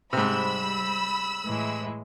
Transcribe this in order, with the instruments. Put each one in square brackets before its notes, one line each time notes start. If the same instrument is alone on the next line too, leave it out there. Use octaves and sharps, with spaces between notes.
[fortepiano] G#2 C3 [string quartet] G3 [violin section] B5 E6
[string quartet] A2 E3 G#3